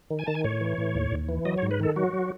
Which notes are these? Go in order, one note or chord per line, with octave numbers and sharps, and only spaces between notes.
D#3
G#5
D#3 A5
G#5
A2 C#5
E3
A2
D#2
D#2
E3
F#3 D#5
C#5
G#2
B4
D#3 A4
F#3 F#4
F#3